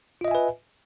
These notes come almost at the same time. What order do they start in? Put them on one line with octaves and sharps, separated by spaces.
F4 D#5 E5 G#5 B4